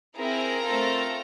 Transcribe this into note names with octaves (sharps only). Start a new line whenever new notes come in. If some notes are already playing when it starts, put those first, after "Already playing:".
C4 E4 G#4 A#4 A#5
A3 C4 F4 A4